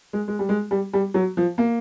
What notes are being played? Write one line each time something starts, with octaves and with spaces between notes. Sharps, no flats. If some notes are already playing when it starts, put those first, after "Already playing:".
G#3
G#3
G3
G#3
G3
G3
F#3
F3
A#3